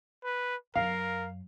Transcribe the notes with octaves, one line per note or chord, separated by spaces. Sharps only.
B4
F#2 A#4 F5